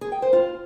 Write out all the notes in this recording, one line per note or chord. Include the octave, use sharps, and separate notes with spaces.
G#4
G5
C5
F4